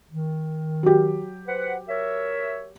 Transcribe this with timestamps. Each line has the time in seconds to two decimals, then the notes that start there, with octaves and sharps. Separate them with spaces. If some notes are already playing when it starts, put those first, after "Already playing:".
0.11 D#3
0.83 F#3 G4
1.48 B4 C5 F#5
1.89 A#4 C#5 E5